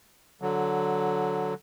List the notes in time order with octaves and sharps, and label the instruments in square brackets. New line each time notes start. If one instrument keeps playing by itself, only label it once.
[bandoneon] D3 F#3